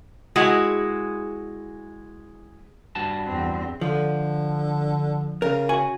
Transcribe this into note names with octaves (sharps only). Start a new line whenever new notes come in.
G#3 E4 F#4
G2 F#4 A5
E2 C4
D3 F3
C#3 A#4
F#4 G#5